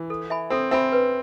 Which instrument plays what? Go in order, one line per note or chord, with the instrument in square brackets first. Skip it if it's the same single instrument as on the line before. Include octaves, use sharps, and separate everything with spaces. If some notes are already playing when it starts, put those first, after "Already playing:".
Already playing: [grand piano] E3
[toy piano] A4
E5 G#5 B5
[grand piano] C4 [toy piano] A4
[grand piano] C4 [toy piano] E5 G#5 B5
[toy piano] B4